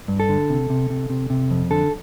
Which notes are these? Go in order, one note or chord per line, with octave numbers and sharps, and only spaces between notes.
G2
A4
D3
C3
C3
C3
C3
C3
F2
D3 A4